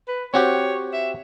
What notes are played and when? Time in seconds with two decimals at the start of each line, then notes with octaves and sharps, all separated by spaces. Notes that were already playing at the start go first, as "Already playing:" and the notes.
0.08 B4
0.34 C4 F#4 G4 C#5
0.93 E5